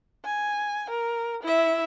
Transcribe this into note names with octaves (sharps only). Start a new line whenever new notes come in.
G#5
A#4
E4 E5